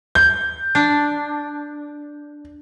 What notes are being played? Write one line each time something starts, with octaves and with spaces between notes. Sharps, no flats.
G6
D4